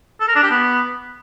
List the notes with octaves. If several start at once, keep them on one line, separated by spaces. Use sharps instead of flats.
A4
A#4
D4
G4
B3